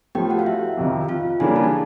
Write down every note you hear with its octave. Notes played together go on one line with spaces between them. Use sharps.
A2 F3 A3 G4 G5
F#4 F#5
F5
E4 E5
F2 C3 D#3
F4 F5
C#3 E3 G3 A#3 D4 G#4 G#5
A4 A5